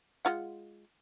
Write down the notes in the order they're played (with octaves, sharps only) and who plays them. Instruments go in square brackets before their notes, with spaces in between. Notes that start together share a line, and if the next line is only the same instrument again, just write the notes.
[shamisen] G#3 F4 F#5